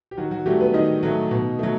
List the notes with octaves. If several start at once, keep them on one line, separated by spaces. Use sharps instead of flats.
G4
D#3 F#3 F#4
F#3 F#4
F#3 G3 A3 G4
B3 B4
D#3 D#4 D#5
F#3 A3
B2
F#3 A3